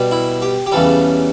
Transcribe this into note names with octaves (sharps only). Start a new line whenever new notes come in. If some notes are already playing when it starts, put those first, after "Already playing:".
Already playing: B2 G3
E4
G4
G4
E2 C#3 E3 G3 A4